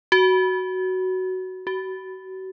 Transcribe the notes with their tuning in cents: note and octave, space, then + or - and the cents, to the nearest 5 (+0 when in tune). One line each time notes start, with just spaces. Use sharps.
F#4 +10
F#4 +35